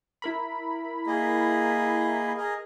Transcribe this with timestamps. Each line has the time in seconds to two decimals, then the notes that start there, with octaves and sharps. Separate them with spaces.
0.22 E4 A#4 B5
1.07 A#3 G#4 D#5
2.37 G#4 A#4 D#5